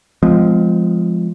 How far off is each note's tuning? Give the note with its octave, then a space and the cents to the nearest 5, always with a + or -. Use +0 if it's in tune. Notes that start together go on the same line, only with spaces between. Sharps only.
F3 -5 G#3 +0 C4 -45